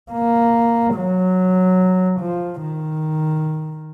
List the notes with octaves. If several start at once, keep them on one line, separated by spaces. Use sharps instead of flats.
A#3
F#3
F3
D#3